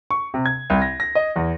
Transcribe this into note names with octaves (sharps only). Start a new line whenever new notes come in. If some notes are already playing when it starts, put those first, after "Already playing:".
C#6
C3
G#6
C2
A#6
A#6
D#5
E2